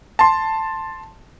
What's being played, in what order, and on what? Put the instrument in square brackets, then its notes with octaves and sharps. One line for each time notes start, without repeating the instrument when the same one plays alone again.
[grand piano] A5 C6